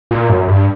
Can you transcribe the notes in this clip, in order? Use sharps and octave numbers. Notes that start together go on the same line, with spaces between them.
A#2
F#2
G2